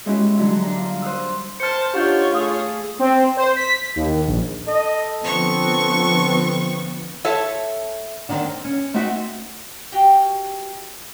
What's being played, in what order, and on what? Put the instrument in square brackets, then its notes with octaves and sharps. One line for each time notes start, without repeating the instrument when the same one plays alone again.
[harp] G#3 C#4 D#4 E4 F#4 G4
D3 E3 F#3 G3 E4
D4 A#5
F4
C5 F#5 D#6 E6
[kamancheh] C5 A5 [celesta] F6 C#7
[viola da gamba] D4 D#4 [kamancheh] F4 C#5 [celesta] G4 F#5 G6
[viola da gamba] A3 G#4 A4 [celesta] F5 D#6
[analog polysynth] C4
C5
B6
D#2
A#1
[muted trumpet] A4 [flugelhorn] D#5
[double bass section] D3 F3 B3 [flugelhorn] C4 [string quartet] C#6
[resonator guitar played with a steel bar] A4 C#5 E5
[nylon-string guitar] D3 D#3 G#3 C4 D4
C4
C#4
A3 C4 D#4 F#4 E5
[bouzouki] F#4 G4 F5 G5